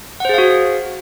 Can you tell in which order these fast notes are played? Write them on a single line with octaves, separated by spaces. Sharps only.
F#5 C5 G#4 F5 F#4